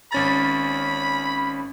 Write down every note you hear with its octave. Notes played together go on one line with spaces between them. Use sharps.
G#1 C#4 B5 A6